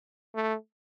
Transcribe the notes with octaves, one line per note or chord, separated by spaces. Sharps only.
A3